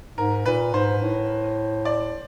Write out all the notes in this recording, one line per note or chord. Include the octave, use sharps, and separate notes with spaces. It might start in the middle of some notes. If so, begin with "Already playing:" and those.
G#2 A#4
A#2 B4
G#2 C5
A2
D5